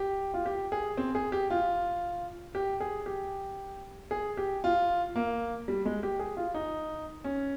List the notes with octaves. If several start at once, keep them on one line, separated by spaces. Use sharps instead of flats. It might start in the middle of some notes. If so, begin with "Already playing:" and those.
Already playing: G4
F4
G4
G#4
C4
G#4
G4
F4
G4
G#4
G4
G#4
G4
F4
A#3
G3
G#3
G4
G#4
F4
D#4
C#4